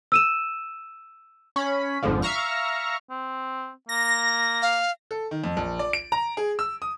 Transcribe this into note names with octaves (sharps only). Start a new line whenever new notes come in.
E6 D#7 E7
C#4 B5
G#1 F2 G#2 D3 F3
E5 F5 A#5 C#6 F6
C4
A#3 A#6
F5
A4
D#3
F2
A#1
D5
D7
A#5
G#4
E6
D#6